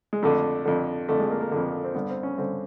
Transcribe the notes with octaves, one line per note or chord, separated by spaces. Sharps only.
G#3
F2 D3 A3
F2 D3
F2 D3 A3
G#3
A#3
A#3
F2 D3
C4
G2 D3 B3
C4
C#4
G2 D3 C4